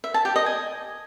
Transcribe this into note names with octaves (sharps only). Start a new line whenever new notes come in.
E5
A5
G4
D#5
G#5